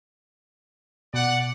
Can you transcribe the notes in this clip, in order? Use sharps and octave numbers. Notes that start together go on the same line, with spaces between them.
B2 D5 F#5